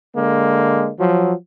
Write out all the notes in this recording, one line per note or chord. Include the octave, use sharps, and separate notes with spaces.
D3 G#3 A#3
F3 F#3